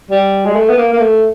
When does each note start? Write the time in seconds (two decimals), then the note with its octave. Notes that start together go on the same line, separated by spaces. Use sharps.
0.11 G3
0.46 G#3
0.56 A3
0.69 B3
0.78 A#3
0.93 A#3
1.00 A3